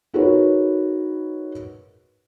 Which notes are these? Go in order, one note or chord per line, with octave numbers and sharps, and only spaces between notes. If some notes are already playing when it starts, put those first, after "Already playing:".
D#4 F#4 G#4 A#4 B4 C#5